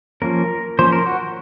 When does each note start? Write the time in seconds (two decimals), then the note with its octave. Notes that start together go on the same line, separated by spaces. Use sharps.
0.22 F3 A#3 C#4 A#4
0.79 F3 A#3 C#4 C5
0.92 A#4
1.06 F#4